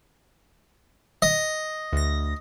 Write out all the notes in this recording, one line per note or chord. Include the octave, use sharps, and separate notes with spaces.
D#5
D2 A#6